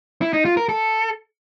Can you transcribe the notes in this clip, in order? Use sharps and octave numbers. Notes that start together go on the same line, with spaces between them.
E4
D#4
F4
A#4
A4